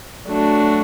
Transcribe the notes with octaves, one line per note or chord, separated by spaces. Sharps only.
F#3 A3 D4 F#4